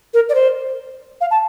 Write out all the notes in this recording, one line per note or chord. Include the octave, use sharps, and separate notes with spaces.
A#4
D5
C5
F5
A5